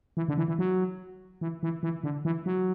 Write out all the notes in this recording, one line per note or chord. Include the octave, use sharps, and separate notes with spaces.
E3
D3
E3
E3
F#3
E3
E3
E3
D3
E3
F#3